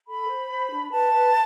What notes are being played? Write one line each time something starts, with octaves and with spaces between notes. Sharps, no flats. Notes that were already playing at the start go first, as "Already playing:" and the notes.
A4 B5
C5
C5
D4
B4 A5
B4